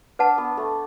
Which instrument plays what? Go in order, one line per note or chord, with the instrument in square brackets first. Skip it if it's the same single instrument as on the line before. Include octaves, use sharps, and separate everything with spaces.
[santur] D4 [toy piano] B4 F#5 A5
[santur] B3
A3